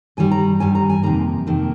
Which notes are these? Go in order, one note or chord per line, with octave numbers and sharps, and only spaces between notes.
G2 D#3 G3 G#5
A#5
G2 D#3 G3 G#5
A#5
G#5
F2 C3 D#3 A#3 A#5
F2 C3 D#3 A#3